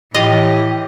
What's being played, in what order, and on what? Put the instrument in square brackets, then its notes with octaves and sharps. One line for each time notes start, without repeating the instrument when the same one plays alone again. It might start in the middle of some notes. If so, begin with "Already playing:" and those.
[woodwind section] A2 [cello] E3 [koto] F4 D#5 [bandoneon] G4